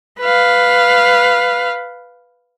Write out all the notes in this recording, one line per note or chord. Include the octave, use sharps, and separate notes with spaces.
B4 F5